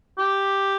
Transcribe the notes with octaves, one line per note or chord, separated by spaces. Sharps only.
G4